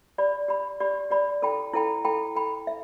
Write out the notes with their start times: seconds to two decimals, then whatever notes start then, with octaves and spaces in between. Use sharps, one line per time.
0.18 G4 D5 B5
0.48 G4 D5 B5
0.80 G4 D5 B5
1.11 G4 D5 B5
1.42 E4 A4 G5 B5
1.74 E4 A4 G5 B5
2.04 E4 A4 G5 B5
2.35 E4 A4 G5 B5
2.67 E5